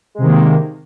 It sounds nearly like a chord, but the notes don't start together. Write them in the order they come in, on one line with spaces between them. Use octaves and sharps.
G#3 C3 D#3 A#3